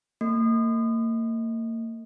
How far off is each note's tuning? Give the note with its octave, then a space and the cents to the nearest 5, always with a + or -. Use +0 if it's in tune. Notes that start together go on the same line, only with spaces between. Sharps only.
A#3 -35